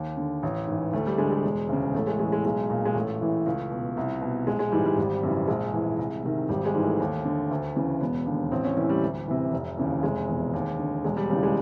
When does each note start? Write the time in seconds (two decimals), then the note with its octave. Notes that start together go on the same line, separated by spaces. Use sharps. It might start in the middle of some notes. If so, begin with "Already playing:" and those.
Already playing: D#2
0.17 D3
0.43 A1
0.67 G#2 E3
0.93 D2 A3
1.06 G3
1.18 D3 G#3
1.31 G#3
1.44 E1
1.69 D2 C#3
1.94 A1 A3
2.07 G#3
2.19 A2 E3 G#3
2.29 A3
2.32 G#3
2.44 B1 G#3
2.70 A#2
2.85 G#3
2.95 A1 A3
3.20 A2 E3
3.46 C#2
3.71 B2
3.97 C2
4.22 B2
4.47 A#1 G#3
4.59 G#3
4.72 G#2 E3 G3
4.85 G3
4.97 G#1 G3
5.23 F#2 C#3 E3
5.48 A#1 G#3
5.73 A2 E3
5.99 C2
6.24 C3 D#3
6.49 G#1 G3
6.66 G#3
6.75 G#2 E3
6.84 A3
7.00 D#2
7.25 D3
7.51 D2
7.76 C#3 E3
8.01 E1 B3
8.26 D#2 D3
8.51 A1 C4
8.64 C#4
8.77 A2 E3 C#4
8.90 G3
9.03 D2
9.28 C3 E3
9.53 F1
9.77 D#2 C#3 E3
10.03 F1 G#3
10.28 E2 B2
10.54 D#2
10.79 D3
11.05 E1 G#3
11.17 G3
11.30 D#2 C#3 E3 G3
11.43 G#3